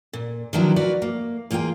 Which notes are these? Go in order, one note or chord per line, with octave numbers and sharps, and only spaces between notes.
A#2
D#3 F3 F#3 B3 D4 E4
F#4 A#4 B4 D5
A#3
E2 A#3 F4 G#4 G5